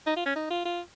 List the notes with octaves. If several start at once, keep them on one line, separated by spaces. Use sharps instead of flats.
D#4
F4
C#4
D#4
F4
F4